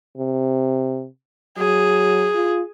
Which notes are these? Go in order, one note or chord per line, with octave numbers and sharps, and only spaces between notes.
C3
F#3 G#4
F4